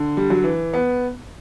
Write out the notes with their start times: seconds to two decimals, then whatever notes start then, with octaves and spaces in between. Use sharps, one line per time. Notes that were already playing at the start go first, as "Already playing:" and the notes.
Already playing: D3
0.17 G3
0.30 F#3
0.44 E3
0.74 B3